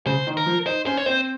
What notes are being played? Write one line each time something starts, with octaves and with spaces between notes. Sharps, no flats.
C#3 C5
D#3
A#4
F3
D#4 C5
C#4 C5
C#5
C4 C5